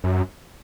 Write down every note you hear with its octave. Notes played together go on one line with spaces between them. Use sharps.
F#2